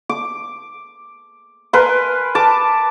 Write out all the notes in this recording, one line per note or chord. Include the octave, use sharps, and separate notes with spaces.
D6
A#4 B4 G#5 C6
A5 D6